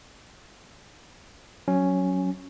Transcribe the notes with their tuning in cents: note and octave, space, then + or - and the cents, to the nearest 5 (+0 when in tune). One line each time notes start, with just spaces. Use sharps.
F#3 +0 C#4 +0